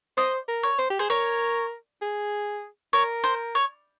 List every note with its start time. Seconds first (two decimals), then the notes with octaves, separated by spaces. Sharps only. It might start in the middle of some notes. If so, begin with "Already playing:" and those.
0.17 C5 D#5
0.48 A#4
0.63 C#5
0.78 C5
0.90 G4
0.99 G#4 C5
1.10 A#4 C#5
2.02 G#4
2.93 A#4 C#5
3.24 C5
3.55 C#5